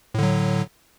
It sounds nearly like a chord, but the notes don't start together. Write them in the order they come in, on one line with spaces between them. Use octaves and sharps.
A2 D3 F#3